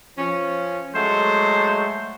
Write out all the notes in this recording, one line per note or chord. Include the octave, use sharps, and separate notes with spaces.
F3 C#4
F#3 G#3 A3 C5